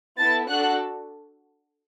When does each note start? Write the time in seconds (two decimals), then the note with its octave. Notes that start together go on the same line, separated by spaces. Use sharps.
0.18 B3 E4 A4 A5 A6
0.48 D4 F#4 A4 F#5 F#6